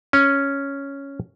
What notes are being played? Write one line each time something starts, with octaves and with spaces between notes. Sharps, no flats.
C#4